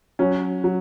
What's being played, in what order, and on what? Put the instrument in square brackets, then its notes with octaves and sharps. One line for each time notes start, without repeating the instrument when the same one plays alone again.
[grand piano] F#3 [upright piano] C#4
[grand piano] F#3